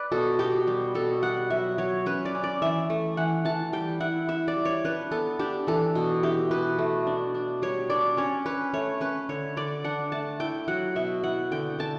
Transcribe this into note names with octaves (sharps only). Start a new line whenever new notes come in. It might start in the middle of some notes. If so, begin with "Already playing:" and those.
Already playing: B4 D5
B2 A4
B2 G4
G3
B2 A4
G3 F#5
F#3 E5
F#3 C#5
C#4 B4
D5
C#4
D5
E3 E5
A3
E3 F#5
E3 A5
G3 G5
E4 F#5
E4 E5
D5
G3
C#5
D4 B4
B3 A4
D4 G4
E3 A4
B2
E4 G4
B2 B4
A3
D4
D4
G3 C#5
D4 D5
C#4 C#5
C#4 B4
A3 C#5
C#4 B4
D3 C#5
D3 D5
D4 F#5
A3 A5
E4 G5
F#3 F#5
B2 E5
E4 F#5
D3 G5
D3 A5